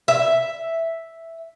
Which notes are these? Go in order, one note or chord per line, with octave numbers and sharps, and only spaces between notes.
E5